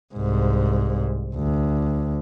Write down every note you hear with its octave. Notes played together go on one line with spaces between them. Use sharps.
C2 G#2
D2